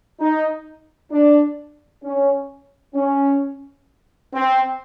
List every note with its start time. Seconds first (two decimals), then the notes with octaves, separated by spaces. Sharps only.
0.20 D#4
1.12 D4
2.03 C#4
2.95 C#4
4.33 C4